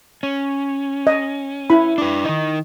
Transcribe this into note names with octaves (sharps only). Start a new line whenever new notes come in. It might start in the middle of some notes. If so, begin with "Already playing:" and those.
C#4
D#5
E4 B5
D4 B4
D#3 D#4